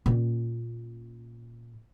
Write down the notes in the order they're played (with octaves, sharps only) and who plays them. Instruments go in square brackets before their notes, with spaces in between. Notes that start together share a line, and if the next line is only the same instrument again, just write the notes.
[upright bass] A#2 C#4